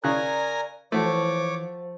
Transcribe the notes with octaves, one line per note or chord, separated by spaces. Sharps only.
C#3 A#4 D5 G#5 A#5 F#6
E3 F3 A3 F#4 C#5 D6